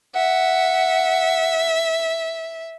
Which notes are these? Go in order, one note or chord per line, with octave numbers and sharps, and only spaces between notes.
E5 F#5